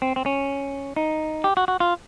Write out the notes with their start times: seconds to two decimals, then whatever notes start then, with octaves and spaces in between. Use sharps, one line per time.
0.02 C4
0.16 C4
0.26 C#4
0.96 D#4
1.44 G4
1.57 F#4
1.68 F#4
1.80 F4